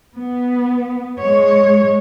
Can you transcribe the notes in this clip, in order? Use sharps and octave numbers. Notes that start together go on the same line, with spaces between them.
B3
G#3 C#5